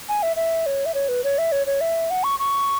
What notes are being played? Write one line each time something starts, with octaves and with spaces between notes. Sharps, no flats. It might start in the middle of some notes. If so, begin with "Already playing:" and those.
G#5
E5
E5
C#5
E5
C#5
B4
C#5
E5
C#5
C#5
E5
F#5
C#6
C#6